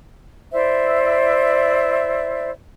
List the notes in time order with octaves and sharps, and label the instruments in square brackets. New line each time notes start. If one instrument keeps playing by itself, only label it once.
[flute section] E4 C5 D5 E5